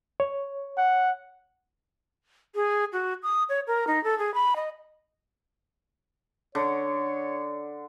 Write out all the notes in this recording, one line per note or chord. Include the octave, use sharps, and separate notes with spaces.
C#5
F#5
G#4
F#4
D#6
C#5
A#4
D#4
A4
G#4
B5
D#5
D3 C#5